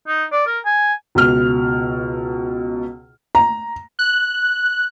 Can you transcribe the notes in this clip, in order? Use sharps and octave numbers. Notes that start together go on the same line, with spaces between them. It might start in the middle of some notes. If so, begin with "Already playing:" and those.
D#4
D5
A#4
G#5
C#2 B2 F6
A#5
F#6